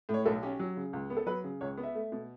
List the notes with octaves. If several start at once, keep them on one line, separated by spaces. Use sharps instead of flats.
A2
C#5
B1 A4
C#4 G4
F#3
C#3
C#2
B3
A4
F#3 B4
C#3
C#2 C#5
B3
E5
A3
B2